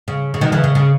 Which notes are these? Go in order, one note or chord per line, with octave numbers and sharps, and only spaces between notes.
C#3
C#3
B2 D#3
C#3 E3
C#3
C#3